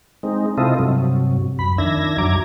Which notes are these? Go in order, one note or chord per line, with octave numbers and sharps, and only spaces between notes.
G#3 C4 D#4
C3 C4 E4 F4 A4 D#5
G2 C3 F#3
F#2 B5
F2 D#3 D4 E5 G#6 A#6
F#2 F#3 A#5 D6 G#6